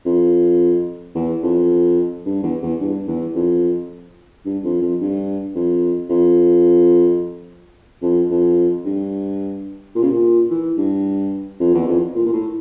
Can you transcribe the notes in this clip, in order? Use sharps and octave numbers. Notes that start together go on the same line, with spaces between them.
F2
E2
F2
G2
E2
E2
G2
E2
F2
G2
F2
F2
G2
F2
F2
F2
F2
G2
A#2
C#3
A#2
E3
G2
F2
E2
F2
A#2
A#2
A2